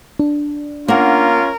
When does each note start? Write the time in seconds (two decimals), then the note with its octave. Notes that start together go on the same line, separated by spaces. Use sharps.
0.19 D4
0.88 A#3 C#4 F4 A#4 F#5